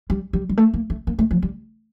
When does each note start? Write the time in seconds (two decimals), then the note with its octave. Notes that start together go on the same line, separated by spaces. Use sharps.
0.10 G3
0.33 G3
0.49 G3
0.57 A3
0.74 A#3
0.90 A3
1.07 A#3
1.19 A3
1.31 F3
1.43 G3